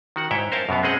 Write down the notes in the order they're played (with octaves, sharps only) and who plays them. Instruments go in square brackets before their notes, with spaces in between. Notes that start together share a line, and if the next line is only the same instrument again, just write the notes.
[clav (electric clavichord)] D#3 F#4 F#5
G#2 E4 C#5 E5 G5
A#4 C5 C#5 E5 F5 A5
F#2 B2 B3 F5
G#3 C4 C#4 G#4 D#5 F#5